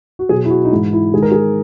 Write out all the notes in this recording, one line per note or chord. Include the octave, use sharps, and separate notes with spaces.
F#4
B2 F#3 G#4
E4
F#4
D#4
G#2 E3 G#3 E4
E4
G#2 D#3 G#3 G#4
A#4
G#4